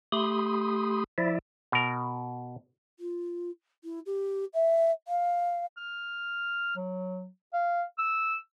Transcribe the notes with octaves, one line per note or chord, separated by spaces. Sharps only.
A3 G4 B5 C6 D#6
F3 E4 D5 E5
B2 A#4
F4
E4
G4
E5
F5
F6
F#3
F5
E6